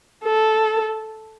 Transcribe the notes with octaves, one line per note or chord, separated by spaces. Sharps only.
A4